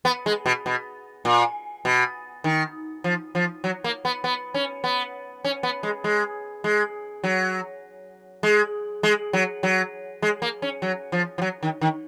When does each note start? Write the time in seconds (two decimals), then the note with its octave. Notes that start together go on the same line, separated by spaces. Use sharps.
0.05 B3
0.26 G#3
0.46 B2
0.66 B2
1.25 A#2
1.85 B2
2.44 D#3
3.04 F3
3.35 F3
3.64 F#3
3.84 A#3
4.05 B3
4.24 B3
4.54 C#4
4.84 B3
5.45 C#4
5.63 B3
5.83 G#3
6.04 G#3
6.64 G#3
7.24 F#3
8.43 G#3
9.03 G#3
9.33 F#3
9.63 F#3
10.22 G#3
10.42 A#3
10.62 C#4
10.82 F#3
11.12 F3
11.38 F3
11.42 F#3
11.63 D#3
11.81 D#3